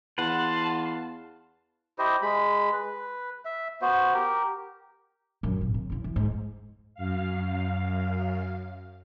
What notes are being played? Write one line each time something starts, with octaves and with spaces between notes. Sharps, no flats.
E2 B4 F5 F#5 A5 C6
E4 G4 C5 D#5
G#3 B5
B4
E5
B3 F#4 C5
G4 A#4
F#2 A#2
G#1
C#3
E2 C#3
E3
G#2
F#2 F5